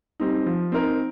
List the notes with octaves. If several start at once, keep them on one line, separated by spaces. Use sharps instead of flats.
G3 C4 D#4
F3
C4 D#4 A#4